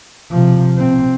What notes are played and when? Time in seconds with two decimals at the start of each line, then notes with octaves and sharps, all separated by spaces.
0.31 C3 F3
0.77 C3 C4